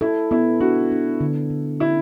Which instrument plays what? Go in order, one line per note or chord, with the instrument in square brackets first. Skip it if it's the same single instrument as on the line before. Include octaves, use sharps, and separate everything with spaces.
[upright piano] E4 [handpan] A4
[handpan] B3 [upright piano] E4
[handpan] D4 [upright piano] F#4
[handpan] D4
D3
D3
[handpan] C#4 [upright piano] E4